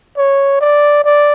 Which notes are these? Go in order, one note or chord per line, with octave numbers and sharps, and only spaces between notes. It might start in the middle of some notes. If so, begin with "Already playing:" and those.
C#5
D5
D5